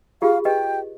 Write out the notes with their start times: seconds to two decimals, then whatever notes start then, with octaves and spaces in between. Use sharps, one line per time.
0.22 F4 G4 G#4 F5
0.45 G4 B4 D#5 G5